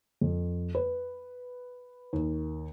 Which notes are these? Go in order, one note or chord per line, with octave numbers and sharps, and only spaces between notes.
F2
B4
D#2